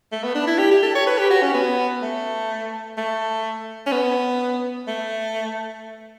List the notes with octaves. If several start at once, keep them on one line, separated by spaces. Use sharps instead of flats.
A3
B3
D4
E4
G4
G4
A4
C#5
B4
G4
F#4
C#4
B3
A3
A3
C#4
B3
A3